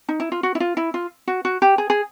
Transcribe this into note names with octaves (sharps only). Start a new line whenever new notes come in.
D#4
E4
F4
F#4
E4
F4
E4
F4
F#4
F#4
G4
G#4
G#4